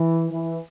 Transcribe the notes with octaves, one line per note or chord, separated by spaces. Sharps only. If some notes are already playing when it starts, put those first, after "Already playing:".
Already playing: E3
E3